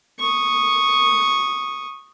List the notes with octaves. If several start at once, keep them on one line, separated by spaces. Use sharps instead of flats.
C#6 D#6